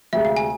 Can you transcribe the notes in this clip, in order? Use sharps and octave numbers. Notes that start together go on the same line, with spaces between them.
D2 C3 G#3 E5
F5
G#5